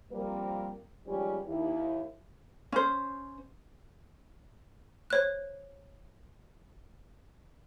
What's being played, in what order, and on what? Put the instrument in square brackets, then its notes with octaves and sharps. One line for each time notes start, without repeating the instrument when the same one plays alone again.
[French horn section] F3 G3 A#3 C4 A#4
D#2 F3 G3 G#3 C#4 G4
D#2 E4
[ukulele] C#4 C5
[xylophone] C5 C#5 F#6